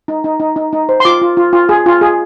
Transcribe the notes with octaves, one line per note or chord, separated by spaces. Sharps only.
D#4
D#4
D#4
D#4
D#4
C5
C6
F4 D6
F4
F4
F4
G#4
F4
G#4